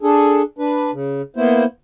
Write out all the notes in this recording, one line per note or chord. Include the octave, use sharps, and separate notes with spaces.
D4 G#4 A4
D4 B4
C#3
A#3 B3 E4 C5